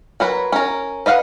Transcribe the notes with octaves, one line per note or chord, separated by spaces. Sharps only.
F#3 A#4 B4
C#4 A#4
B4 D#5 F5 F#5